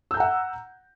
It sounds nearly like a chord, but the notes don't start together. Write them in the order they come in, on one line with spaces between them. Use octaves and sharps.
E6 G6 A#5 F#5